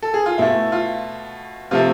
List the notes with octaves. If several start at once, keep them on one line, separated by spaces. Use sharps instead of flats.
A4
G#4
F4
B2 A3 E4
F4
C3 F3 A3 F4